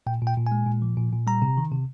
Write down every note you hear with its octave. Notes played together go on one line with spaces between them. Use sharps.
A#2 G5
A#2 G5
A#2
G#5
G#3
A#2
F3
A#2
A#2
G3 A#5
C3
D#3
C3